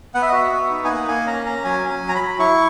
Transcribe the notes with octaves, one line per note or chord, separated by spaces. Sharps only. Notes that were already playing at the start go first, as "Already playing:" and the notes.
B3 F#5
E5
D#5
F#4 E5
B3
D#4
G#5
A#3 F#5
A#3 G#5
C#4 A#5
C#4 A#5
F#3 G#5
C#4
G#5
F#3
A#5
B5
F#3
E4 C#6